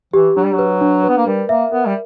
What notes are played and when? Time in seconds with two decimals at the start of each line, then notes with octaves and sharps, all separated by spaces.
0.13 E3 G4
0.36 F#3 D4
0.45 G3
0.53 F#3
0.59 B4
0.81 D4
1.04 B4
1.09 B3
1.17 A#3
1.27 G3 A#4
1.49 A#3 E5
1.72 B3 A#4
1.87 G3